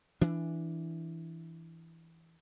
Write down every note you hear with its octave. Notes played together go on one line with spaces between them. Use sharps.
E3 D4